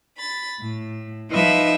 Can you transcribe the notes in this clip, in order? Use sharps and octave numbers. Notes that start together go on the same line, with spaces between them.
B5 A6
A2
F3 D#4 B4 D#5 E5